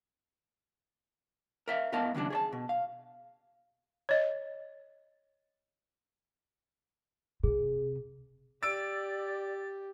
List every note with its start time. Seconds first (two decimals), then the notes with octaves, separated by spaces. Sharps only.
1.68 A#4 E5 F5
1.92 A2 B3 A#4 D#5 F5 A5
2.15 D#2 C#3 F#3 D4
2.30 G#4 C#5 A5
2.52 B2
2.69 F5
4.09 C#5 D#5
7.43 C3 G#4
8.63 G4 D5 E6 A6 D7